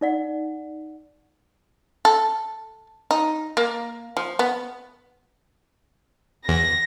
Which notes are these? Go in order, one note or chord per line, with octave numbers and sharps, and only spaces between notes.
D#4 D5 F#5
A4
D#4
A#3
F3
B3
E2 A#6